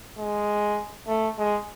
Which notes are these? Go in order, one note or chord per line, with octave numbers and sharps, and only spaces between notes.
G#3
A3
G#3